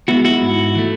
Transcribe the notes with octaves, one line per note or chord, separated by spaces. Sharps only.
G#3 B3 E4 F#4
E4 F#4
G#2
E3 A3